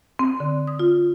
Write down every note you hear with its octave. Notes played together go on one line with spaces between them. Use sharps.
C4
D3
D#6
F4